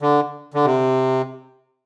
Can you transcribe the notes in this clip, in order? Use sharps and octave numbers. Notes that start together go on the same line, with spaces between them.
D3
D3
C3